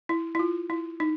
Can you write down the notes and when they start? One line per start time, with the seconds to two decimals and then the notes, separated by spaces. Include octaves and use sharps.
0.09 E4
0.35 E4
0.39 F4
0.70 E4
1.00 D#4